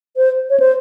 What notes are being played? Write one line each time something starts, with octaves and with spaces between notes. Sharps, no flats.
C5
C#5
C5